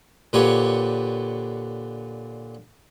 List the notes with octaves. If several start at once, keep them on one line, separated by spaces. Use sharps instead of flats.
A#2 D3 G4 B4 C#5 C#6